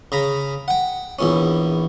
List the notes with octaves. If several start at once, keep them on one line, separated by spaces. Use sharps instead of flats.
C#3 A#5 B5
F#5 G5
A#1 E2 C#4